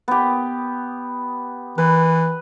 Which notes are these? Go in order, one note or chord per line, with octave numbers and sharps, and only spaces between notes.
B3 G4
E3 B4